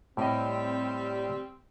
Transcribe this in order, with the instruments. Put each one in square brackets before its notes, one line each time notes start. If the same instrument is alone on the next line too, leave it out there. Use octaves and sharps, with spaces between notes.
[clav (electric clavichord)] A2 D#5 [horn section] G3 C4